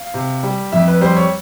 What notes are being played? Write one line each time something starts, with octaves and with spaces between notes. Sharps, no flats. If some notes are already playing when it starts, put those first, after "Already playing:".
Already playing: F5
C3
G3
F2 E5
B4
G3 C5
C#5